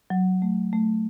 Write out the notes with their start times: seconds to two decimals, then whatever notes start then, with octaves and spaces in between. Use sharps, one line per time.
0.10 F#3
0.42 A3
0.73 A3